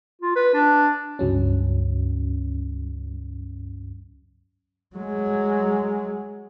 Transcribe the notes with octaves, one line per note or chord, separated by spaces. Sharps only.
F4
B4
D4
C#2 G2 F#3 C#4
F#3 G#3